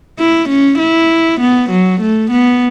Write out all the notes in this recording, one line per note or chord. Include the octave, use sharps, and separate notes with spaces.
E4
C#4
E4
B3
F#3
A3
B3